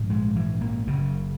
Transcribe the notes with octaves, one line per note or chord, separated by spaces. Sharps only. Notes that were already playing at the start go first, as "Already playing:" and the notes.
Already playing: A#1 G#2
G#3
E3
A#3
F#1 F#2 C#3